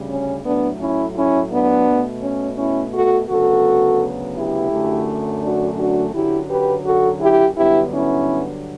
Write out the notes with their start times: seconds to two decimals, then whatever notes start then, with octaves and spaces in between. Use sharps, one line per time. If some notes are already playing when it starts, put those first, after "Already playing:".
Already playing: D2 C#3 G3
0.08 C#4
0.43 A2 F#3 A3 B3 D4
0.79 C#4 E4
1.15 C#4 E4
1.51 B3 D4
1.86 B2 A3
2.22 C#4
2.57 C#4 E4
2.93 F#4 A4
3.28 D2 C#3 F#3 B3 F#4 A4
4.35 E4 G4
4.71 F#2 D3 F#3 A3
5.42 D4 F#4
5.78 D4 F#4
6.13 F#2 D3 F#3 E4 G4
6.48 G4 B4
6.84 F#4 A4
7.19 E4 G4
7.55 G2 D3 F#3 B3 E4 G4
7.91 C#4 E4